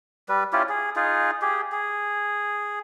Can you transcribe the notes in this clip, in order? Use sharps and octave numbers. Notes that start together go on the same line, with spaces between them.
G3 B4
C#4 E4 F4 G4
G#4
D#4 F4 G#4
G4 G#4
G#4